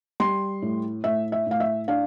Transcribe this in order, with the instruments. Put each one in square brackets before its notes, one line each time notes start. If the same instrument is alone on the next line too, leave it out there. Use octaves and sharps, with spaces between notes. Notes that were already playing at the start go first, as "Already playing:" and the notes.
[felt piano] G3 C6
A2
A2 E5
E5
A2 F5
E5
D4 F5